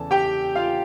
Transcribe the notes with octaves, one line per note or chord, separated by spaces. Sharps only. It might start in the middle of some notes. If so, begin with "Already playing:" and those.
Already playing: E2 C#3 E3 A4 A5
G4 G5
F4 F5